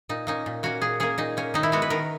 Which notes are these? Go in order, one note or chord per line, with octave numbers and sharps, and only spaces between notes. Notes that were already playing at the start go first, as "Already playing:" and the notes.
A#2 D#4
A#3 C#4 D#4
A#2
A#3 C#4 F#4
A#2 G#4
A#3 C#4 G#4
A#2 D#4
A#3 C#4
D#3 D#4
E4
G#3 B3 F#4
B4
D#3 A#4